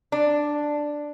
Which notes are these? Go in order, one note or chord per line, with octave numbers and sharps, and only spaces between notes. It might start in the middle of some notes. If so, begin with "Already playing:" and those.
D4